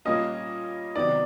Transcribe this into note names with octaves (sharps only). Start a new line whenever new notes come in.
A#2 G3 A#3 C#4 F4 D#5
C3 D#3 F#3 B3 D#4 D5